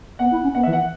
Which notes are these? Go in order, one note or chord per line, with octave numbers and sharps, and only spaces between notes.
B3 F#5
E4
C#4
B3 F#5
E5
E3
F#5